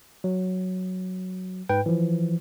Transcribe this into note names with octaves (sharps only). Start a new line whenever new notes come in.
F#3
G#2 B4 G5
E3 F3